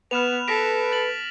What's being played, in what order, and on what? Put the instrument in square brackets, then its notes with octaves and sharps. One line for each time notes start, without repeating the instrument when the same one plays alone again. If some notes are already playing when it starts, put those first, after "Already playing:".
[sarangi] B3 [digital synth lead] B4 [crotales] F6 E7 F7
[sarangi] A4 [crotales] A#6 B6 D7
[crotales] A6 F#7